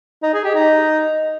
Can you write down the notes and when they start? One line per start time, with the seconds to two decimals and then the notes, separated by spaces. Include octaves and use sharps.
0.23 D#4
0.33 G#4
0.44 G4
0.54 D#4